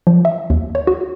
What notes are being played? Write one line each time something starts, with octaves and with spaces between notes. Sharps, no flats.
F3
E5
D#2
C#5
F#4